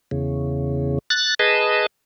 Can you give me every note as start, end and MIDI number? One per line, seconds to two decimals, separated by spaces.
0.11 0.98 40
0.11 0.98 49
1.10 1.34 90
1.10 1.34 93
1.39 1.86 68
1.39 1.86 71
1.39 1.86 75
1.39 1.86 81